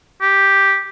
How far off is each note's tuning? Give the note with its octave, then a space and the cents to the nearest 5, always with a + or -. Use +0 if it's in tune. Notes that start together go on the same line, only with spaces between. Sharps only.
G4 +0